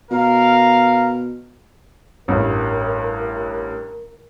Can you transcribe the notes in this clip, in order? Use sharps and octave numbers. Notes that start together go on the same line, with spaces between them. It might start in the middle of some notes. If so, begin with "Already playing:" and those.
B2 A#4 F5
A1 G2 A#4